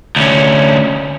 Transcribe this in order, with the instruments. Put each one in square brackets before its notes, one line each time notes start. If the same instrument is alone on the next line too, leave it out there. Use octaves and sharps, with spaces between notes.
[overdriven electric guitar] D2 C#4